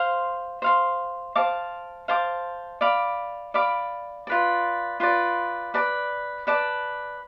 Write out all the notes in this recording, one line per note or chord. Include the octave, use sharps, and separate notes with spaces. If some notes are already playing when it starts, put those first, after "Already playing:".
Already playing: C5 F5 C6
C5 F5 C6
C5 F5 A5 D6
C5 F5 A5 D6
D5 F5 B5 D6
D5 F5 B5 D6
F4 B4 D5
F4 B4 D5
B4 D5 A5 D6
B4 D5 A5 D6